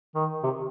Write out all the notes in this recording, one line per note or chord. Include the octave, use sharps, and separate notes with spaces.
D#3
C3